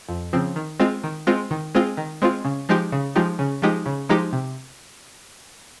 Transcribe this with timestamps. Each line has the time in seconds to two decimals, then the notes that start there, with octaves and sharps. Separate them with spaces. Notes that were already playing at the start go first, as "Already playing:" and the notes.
0.09 F2
0.33 C#3 F3 C4
0.56 D#3
0.80 G#3 C4 F4
1.04 D#3
1.27 G#3 C4 F4
1.51 D#3
1.75 G#3 C4 F4
1.97 D#3
2.22 G#3 C4 F4
2.45 C#3
2.69 F3 G#3 D#4 G4
2.92 C#3
3.15 F3 G#3 D#4 G4
3.39 C#3
3.62 F3 G#3 D#4 G4
3.86 C#3
4.09 F3 G#3 D#4 G4
4.33 C3